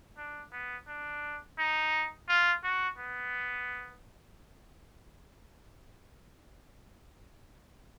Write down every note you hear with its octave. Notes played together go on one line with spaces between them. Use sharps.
D4
B3
D4
D#4
F4
F#4
B3